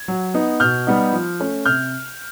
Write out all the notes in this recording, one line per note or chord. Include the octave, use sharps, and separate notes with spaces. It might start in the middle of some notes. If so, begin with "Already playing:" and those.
Already playing: G#6
F#3
B3 D#4
B2 F6 G6
G3 B3 D#4
F3
A3 C#4
C3 F6 G6